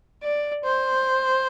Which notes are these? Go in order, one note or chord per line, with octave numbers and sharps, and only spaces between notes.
D5
C5